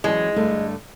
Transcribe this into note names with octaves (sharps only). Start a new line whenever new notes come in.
E3 F#3 G#3 C#4
G2 D3 A3